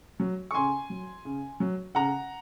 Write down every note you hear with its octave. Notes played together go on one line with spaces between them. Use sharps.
F#3
C#6
C#3 G#5 C6
F#3
C#3
F#3
C#3 F#5 A#5